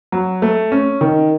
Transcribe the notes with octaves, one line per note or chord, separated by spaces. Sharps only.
F#3
A3
C#4
D#3